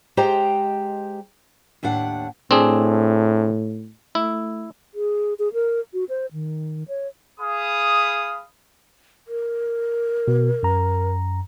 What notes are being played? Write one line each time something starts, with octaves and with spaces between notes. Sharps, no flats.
G#3 G4 C5 D#5 G5 A#5
D#2 A2 D4 F#5
A2 C4 D4 G#4
A3 E4
G#4
G#4
A#4
F#4
C5
D#3
C#5
G#4 F5 B5 D#6
A#4
B2
F#2 A#5